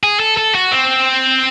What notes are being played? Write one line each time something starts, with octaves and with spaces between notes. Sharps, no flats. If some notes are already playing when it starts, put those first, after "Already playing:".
G#4
A4
A4
F#4
C4